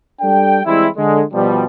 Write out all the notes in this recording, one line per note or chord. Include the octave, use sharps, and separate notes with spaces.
G3 D4 A4 G5
E3 G3 G#3 C4 E4
D3 G#3
B2 F3 G3